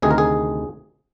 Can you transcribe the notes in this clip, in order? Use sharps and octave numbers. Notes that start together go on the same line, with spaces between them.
D2 C3 D#3 G#4
A#4
G#4